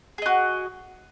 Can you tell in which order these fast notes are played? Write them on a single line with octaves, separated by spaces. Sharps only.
G#4 D#5 F#4